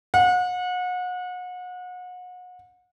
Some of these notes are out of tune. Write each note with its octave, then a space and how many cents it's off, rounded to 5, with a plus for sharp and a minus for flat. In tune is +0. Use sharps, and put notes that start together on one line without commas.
F#5 -35